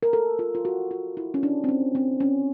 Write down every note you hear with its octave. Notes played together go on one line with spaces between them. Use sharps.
A#4
A4
F4
F4
F#4
F4
E4
C#4
D4
C4
C#4
C4
C#4